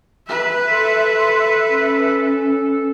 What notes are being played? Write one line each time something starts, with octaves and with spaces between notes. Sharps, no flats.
B4 E5
A4 C6
C#4